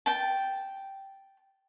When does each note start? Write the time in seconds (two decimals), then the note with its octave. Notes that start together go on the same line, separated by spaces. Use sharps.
0.06 G5 A5